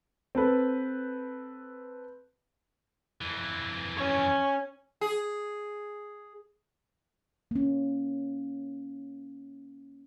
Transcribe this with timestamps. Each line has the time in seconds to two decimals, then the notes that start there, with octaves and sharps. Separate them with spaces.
0.35 C4 A4 B4
3.21 F2 E3
3.98 C#4 C#5 G#5
5.01 G#4
7.51 A#3 C#4